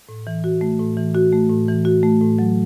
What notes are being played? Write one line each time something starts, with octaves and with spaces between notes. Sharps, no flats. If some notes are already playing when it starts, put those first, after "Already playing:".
A2
E3
F#4
A3
A2
E3
F#4
A3
A2
E3
F#4
A3
A2
F#3